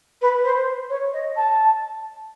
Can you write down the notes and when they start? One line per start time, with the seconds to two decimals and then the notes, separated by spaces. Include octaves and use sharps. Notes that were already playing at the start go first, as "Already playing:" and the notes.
0.21 B4
0.44 C5
0.89 C#5
1.13 D#5
1.36 A5